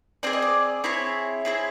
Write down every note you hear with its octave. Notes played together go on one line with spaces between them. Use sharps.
C4 E4 G#4 D5
D#5
D5
C4 E4 G#4 C#5
C4 E4 G#4